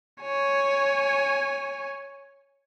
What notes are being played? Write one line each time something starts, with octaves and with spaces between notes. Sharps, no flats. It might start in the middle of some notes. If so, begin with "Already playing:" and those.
C#5 G#5